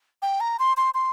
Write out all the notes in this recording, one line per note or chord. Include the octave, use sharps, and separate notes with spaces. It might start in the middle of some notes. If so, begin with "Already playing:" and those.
G5
A#5
C6
C6
C6